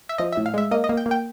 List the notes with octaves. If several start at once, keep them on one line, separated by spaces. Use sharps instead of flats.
E5
F3 D#5
A2 E5
F5
G#3 E5
A#3 D#5
D#5
A#3
G5
A#3
G5